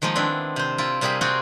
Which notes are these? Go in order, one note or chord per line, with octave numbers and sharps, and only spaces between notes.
D#3 F3 G#3 A#3 D#4
D#3 B3 C4 D4 E4
C3 C5
E4 F4 A#4
C3 G3 A#3 G#4 G5 B5
C4 F4 F#4 G#4 A#4